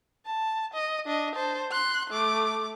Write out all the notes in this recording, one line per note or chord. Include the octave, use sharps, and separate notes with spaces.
A5
D#5
D4 D#5
C5 A5
C6 F#6
A3 D6